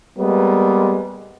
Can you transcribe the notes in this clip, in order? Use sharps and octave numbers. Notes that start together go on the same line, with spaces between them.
G3 G#3 A#3 B3